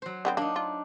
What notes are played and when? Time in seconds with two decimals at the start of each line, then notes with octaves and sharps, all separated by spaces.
0.02 F#3 C5
0.25 D3 B3 C4
0.37 A#3 D4 D#4
0.56 F4